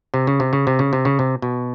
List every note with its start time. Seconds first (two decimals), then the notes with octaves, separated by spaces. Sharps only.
0.14 C3
0.27 C#3
0.40 C3
0.53 C#3
0.67 C3
0.79 C#3
0.93 C3
1.05 C#3
1.19 C3
1.42 B2